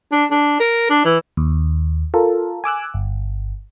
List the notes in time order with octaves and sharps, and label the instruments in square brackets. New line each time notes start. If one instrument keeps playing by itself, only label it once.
[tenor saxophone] D4
D4
A#4
D4
E3
[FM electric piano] D#2
F4 A4 A#4
G#5 D6 E6 F#6
G1